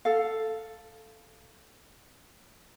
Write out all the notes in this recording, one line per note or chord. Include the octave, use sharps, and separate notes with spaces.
A4 F5